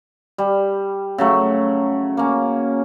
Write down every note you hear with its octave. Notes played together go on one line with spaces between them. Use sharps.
G3
C#3 F#3 A3
A#3 C#4